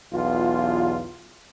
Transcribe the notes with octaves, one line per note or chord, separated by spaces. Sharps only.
B1 E2 F4